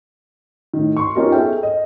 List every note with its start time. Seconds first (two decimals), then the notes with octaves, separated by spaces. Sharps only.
0.73 A2 D#3
0.97 C6 C#6
1.16 B3 C#4 D#4 F4 G4 A#4
1.32 G#4 A4 E5 G5
1.63 D#5